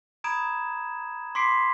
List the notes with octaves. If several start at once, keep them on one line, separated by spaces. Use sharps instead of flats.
A#5 B5 D#6 G#6 D7 E7
C6 D6 B6 C7 D7